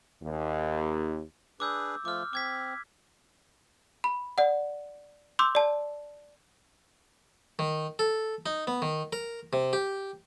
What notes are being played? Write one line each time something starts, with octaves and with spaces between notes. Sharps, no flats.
D#2
D4 G#4 B4 D6 E6 G6
F3 A3 F4 D6 F6
C4 D6 G#6 B6
B5
D5 F#5
C6 D6 E6 G6
D5 A5
D#3
A4
D#4
B3
D#3
A#4
C3
G4